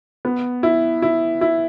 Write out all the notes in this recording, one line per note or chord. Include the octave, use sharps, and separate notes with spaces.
B3
E4
E4
E4